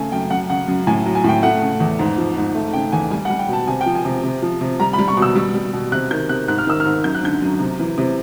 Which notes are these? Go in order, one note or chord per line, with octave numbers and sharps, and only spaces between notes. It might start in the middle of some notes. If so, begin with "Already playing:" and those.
Already playing: C#3 A3 G#5
F#2 G5
F#2 F#5
C#3 F#5
F#2
A2 G#5
F#3
G#5
A2 G5
A3 F#5
C#3
E2
G#2
F3
G#2
A3
C#3 G5
E2 G#5
G3 G#5
F#5
G3
G5
B2 A5
C3 G#5
G5
F3
G#5
C3
C3
F3
C3
G3 A#5
B5
G3
C#6
B2
E6
G3
G3
B2
C3 F#6
D#3 G6
C3 F#6
G#2 F#6
F6
D#3 E6
F6
G#2
F#2 G6
F#6
D3 G6
F#2
C3
E3
C3